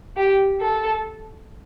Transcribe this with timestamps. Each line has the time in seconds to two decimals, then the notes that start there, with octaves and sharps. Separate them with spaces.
0.17 G4
0.61 A4